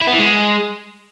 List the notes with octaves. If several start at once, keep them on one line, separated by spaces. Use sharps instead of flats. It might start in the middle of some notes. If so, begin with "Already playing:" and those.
E4
B3
E3
G#3